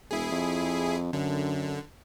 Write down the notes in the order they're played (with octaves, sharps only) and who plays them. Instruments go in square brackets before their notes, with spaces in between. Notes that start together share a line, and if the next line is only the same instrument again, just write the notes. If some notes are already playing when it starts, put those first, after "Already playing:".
[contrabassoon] E1 [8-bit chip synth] E4 G#4
[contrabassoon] F2
[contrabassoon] F#2 [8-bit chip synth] D3